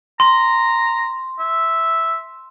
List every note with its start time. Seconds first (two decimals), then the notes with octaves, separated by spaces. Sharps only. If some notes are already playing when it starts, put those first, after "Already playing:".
0.20 A#5 C6
1.40 E5